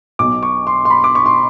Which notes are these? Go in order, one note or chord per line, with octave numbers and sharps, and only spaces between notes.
B1 B2 D6
C#6
C6
C6
B5
D6
C#6
C6